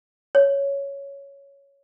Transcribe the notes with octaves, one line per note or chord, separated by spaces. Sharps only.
C#5